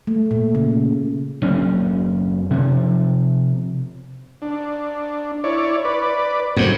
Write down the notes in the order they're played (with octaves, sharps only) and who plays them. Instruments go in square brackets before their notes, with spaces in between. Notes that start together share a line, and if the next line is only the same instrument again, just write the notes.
[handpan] A3
A#2
C#3
[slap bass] F#1 C4 C#4
C3 F3
[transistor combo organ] D4
E4 C#5 D5
B4 D5
[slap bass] F2 G#2 [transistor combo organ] C3 F#3